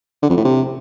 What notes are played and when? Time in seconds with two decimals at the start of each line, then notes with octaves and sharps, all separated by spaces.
0.22 D3
0.30 F2
0.37 A2
0.44 C3